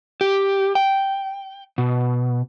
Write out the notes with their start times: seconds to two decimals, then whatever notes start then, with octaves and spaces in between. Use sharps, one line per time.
0.21 G4
0.75 G5
1.78 B2